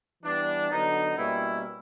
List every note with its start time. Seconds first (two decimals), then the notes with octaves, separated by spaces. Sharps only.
0.23 E3 G3 B3 D4
0.70 D3 F#3 B3 D#4
1.17 B2 G3 A#3 C#4 E4